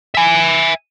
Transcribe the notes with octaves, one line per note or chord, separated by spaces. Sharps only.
E5 G#5